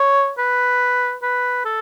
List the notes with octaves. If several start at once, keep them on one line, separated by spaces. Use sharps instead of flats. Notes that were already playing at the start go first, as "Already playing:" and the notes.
Already playing: C#5
B4
B4
A4